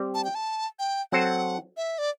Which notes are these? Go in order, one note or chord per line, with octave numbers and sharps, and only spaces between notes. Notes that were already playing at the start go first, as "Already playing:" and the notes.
Already playing: G3 C4 G4 D5
A5
G5
A5
G5
F#3 C4 F#4 A4 C5 F#5
E5
D5